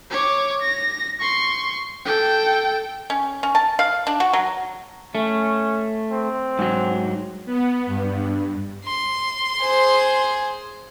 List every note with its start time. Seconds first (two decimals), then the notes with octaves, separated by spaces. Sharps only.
0.11 C#5 D6
0.61 A#6
1.20 C6 C#6
2.05 A4 G5
3.10 C#4
3.43 C#4
3.55 A5
3.79 F5
4.07 D4
4.20 F#4
4.33 F#3
5.15 A3 C#4
6.11 C4
6.59 G#2 F#3
7.46 B3
7.86 G2
8.85 C6
9.62 G#4 C5